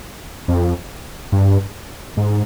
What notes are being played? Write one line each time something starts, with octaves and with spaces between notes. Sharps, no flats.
F2
G2
G#2